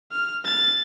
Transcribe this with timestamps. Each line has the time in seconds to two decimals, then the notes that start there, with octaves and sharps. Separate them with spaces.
0.12 F6
0.45 A6